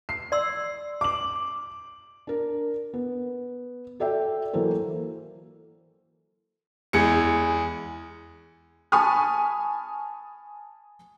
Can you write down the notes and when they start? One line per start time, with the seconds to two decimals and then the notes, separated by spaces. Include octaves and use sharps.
0.09 C7
0.32 D5 C6 E6
1.01 D6 F#7
2.27 D4 A#4
2.94 B3
4.00 F#4 A4 D5 E5 G5
4.53 E3 F#3 A#3 A4 C5
6.93 E2 G#3 C#7
8.92 G#5 A5 B5 C#6 D#6 F6